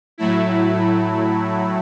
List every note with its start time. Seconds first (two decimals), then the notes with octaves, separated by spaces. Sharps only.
0.18 A2 F#3 A3 E4